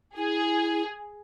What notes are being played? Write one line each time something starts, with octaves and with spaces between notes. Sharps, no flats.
E4 G#4